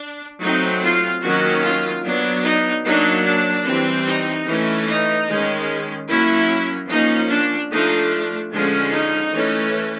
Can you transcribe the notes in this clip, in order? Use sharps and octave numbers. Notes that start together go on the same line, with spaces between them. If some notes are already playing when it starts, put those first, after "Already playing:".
Already playing: D4
F#3 A3 C4 D#4
F4
D#3 F#3 A#3 C#4 F#4
F4
F#3 B3 D4
D#4
F#3 A#3 D4 D#4
D4
E3 G3 C4
D#4
E3 A3 C#4
D#4
D#3 G#3 C#4
F#3 A#3 C#4 E4
F3 A#3 C#4 D#4
D4
F3 A3 D4 D#4
D3 F3 G#3 C#4
D#4
E3 A3 C#4